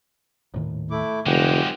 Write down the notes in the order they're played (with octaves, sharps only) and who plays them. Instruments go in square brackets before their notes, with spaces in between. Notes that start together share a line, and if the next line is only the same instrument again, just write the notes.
[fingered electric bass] D#1 A2 D#3
[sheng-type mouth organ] A3 E4 D6
[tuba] F1 [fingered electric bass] D3 [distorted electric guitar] F#3 G#3 [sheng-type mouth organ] F#5 G5 D6